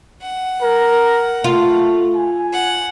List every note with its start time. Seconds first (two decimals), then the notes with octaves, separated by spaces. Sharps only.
0.22 F#5
0.62 A#4
1.44 A3 F4
2.16 G#5
2.53 F#5